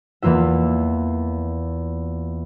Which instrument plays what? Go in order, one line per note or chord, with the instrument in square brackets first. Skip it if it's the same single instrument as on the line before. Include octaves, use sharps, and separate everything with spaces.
[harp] E2 E3 A#3 F4 E5